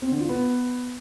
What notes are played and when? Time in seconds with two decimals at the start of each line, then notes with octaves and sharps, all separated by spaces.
0.02 C4
0.11 D3
0.20 F4
0.29 B3